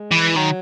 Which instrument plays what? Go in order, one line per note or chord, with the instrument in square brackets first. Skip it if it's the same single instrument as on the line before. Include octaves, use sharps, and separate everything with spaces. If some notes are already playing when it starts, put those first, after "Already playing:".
Already playing: [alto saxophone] G#3
[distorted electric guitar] E3
[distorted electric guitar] D#3 [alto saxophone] F#3